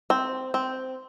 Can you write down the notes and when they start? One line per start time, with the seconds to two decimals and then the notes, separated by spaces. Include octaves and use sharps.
0.10 C4
0.54 C4